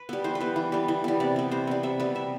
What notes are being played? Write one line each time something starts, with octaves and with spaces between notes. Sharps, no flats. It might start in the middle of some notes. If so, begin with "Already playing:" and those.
Already playing: B4
G3 B3
E3 C5
B4
G3 B3
E3
G3 B3
E3
G3 B3
C3 D5
G3 B3
C3 C5
G3 B3
C3 E5
G3 B3
C3 E5